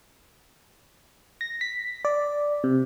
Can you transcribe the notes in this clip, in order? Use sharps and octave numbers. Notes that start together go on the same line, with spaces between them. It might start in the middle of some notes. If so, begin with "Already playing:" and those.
A#6
B6
D5
C3